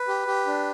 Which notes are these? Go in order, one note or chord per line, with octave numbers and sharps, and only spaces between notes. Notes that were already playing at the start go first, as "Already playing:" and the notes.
Already playing: B4
G4
G4
D4